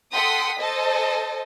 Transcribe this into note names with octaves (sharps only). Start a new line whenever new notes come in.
A4 F#5 G5 C6 D#6 B6
A4 C5 D#5 A5